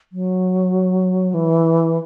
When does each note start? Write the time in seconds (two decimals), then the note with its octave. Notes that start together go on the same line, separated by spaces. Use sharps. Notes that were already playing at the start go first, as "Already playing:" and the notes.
0.13 F#3
1.34 E3